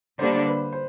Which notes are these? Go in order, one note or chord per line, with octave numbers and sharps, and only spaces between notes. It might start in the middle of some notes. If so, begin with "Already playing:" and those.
D3 G3 A#3 D4 C5
B4
C5